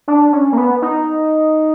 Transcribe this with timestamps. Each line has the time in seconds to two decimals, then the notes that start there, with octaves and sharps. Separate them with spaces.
0.08 D4
0.33 C#4
0.53 A#3
0.57 B3
0.82 D#4